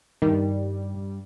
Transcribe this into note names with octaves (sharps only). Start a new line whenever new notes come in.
G2 D#3 G3